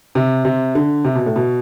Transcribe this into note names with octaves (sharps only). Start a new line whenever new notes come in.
C3
C3
D3
C3
B2
A2
B2